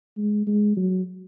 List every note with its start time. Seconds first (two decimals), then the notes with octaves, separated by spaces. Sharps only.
0.17 G#3
0.47 G#3
0.77 F#3